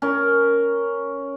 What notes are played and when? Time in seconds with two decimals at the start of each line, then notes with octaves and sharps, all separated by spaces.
0.02 C#4 A#4